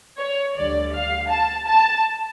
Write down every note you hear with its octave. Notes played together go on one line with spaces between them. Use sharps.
C#5
D2 D3 G3 D5
F5
A5
A5